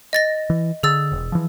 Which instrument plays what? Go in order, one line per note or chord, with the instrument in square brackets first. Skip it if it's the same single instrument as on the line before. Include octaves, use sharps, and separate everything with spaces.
[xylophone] D#5 A6 A#6
[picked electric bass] E3
[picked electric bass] D3 [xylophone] G#4 E6 A6
[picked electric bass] E1
E3 F3